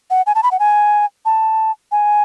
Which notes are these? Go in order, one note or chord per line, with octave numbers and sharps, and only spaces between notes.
F#5
G#5
A5
B5
F#5
G#5
A5
G#5